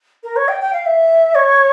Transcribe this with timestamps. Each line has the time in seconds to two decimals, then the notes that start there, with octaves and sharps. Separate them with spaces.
0.24 A#4
0.36 C#5
0.48 G5
0.61 G5
0.73 F5
0.86 E5
1.35 C#5